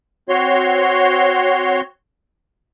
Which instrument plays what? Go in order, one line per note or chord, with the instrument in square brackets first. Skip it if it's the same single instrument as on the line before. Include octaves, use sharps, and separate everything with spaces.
[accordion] C4 F#4 C#5 C6